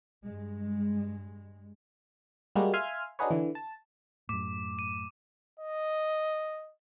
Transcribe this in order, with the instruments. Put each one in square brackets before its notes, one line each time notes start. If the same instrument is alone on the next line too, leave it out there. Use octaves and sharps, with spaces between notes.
[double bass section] G2 G#3
[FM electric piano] G3 G#3 A#3 F#4
E5 F5 G#5 C6 F6
D4 D#4 F#4 G#4 B4 C#5
D3 E3
A5
[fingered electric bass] F#2 A2 [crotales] D6
[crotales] D#7
[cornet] D#5